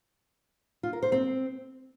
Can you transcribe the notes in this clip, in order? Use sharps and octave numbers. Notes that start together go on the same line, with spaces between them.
F4
A#4
C5
C4